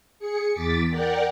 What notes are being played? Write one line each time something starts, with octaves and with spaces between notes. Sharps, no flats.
G#4 C#7
E2 D6 A6 B6
A#4 D5 F#5 G5